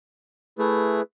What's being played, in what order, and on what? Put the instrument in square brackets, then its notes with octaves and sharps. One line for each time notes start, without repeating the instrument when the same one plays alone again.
[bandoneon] A3 [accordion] E4 G#4 B4